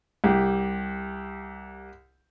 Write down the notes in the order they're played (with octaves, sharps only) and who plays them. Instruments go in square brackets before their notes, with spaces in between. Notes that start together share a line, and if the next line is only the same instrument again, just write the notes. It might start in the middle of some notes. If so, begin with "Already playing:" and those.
[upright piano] C2 G4